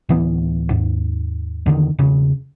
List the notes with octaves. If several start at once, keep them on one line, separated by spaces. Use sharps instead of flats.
D1 E3 B3
D#2 G#2
E2 D3 D#3
E1 C#3